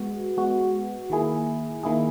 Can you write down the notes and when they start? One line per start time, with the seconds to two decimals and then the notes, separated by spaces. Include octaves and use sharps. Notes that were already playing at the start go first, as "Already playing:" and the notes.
Already playing: G#3 B3 F#4
0.37 G#3 B3 F#4
1.10 D#3 A#3 E4 G#4
1.83 D#3 A#3 E4 G#4